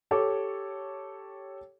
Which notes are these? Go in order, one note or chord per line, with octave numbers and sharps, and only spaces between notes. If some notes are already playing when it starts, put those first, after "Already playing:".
G4 A4 C#5 D6